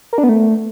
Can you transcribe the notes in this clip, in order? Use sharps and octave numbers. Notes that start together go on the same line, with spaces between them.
A#4
D4
B3
A3